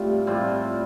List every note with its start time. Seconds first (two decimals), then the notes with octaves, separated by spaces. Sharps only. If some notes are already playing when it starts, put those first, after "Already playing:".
Already playing: A2 G3 C4 F4
0.27 A2 G3 C4 F4